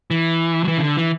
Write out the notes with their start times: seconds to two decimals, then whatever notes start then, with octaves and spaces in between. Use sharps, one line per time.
0.11 E3
0.64 F#3
0.68 E3
0.78 C#3
0.82 D3
0.97 E3